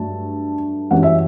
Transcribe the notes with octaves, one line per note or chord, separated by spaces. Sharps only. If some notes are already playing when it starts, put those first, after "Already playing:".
Already playing: G2 F#3 A3 A5
F#2 E3 G3 F#5
E5